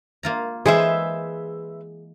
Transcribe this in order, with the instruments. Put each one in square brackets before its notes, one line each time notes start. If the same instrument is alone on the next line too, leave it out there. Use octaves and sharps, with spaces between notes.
[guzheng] A#3 F4 A#5
[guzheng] E3 G#3 [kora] G#4 [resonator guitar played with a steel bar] B4 C5 E5